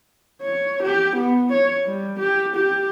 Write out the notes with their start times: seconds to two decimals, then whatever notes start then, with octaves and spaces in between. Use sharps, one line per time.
0.42 C#5
0.83 G4
1.16 B3
1.52 C#5
1.86 G3
2.19 G4
2.55 G4